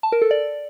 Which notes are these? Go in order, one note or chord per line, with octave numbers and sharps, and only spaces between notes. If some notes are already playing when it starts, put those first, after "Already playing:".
A5
A#4
A4
D5